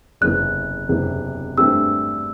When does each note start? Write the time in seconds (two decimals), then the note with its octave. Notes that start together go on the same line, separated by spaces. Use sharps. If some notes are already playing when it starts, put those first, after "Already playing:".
0.21 F#1 E2 C3 E3 F#6
0.89 F#1 E2 C3 E3
1.57 G2 E3 A3 C4 G4 E6